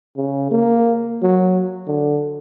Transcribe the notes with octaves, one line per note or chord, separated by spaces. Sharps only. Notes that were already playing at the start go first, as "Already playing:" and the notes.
C#3
A#3
F#3
D3